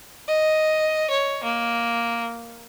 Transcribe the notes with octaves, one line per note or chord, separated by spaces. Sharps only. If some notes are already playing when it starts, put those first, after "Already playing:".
D#5
C#5
A#3